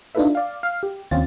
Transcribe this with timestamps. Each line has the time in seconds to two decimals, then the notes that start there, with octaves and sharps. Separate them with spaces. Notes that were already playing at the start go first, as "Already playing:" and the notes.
0.15 D4 D#4 F4 A4 B4 E5
0.35 D5 F5
0.63 F5
0.83 G4
1.11 D#2 C4 C#4 F4 A6